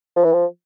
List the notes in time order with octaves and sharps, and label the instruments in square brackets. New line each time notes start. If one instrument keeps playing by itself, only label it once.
[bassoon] F3
E3
F3